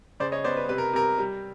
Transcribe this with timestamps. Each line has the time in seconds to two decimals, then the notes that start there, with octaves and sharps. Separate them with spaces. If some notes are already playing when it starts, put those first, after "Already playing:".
0.20 C#3 C5 D5
0.32 C#5 D#5
0.44 B3 C5 D5
0.57 B4
0.69 C3 B4
0.78 A#4
0.93 C3 A#4
1.18 G3